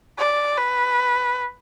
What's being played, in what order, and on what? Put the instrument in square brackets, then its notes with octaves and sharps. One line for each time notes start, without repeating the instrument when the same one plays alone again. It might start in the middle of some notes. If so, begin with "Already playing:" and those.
[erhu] D5
B4